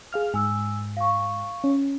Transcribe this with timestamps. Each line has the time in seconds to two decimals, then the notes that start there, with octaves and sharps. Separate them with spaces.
0.13 G#4 F5 F6
0.34 G#2 G#5 E6
0.97 F5 C#6
1.64 C#4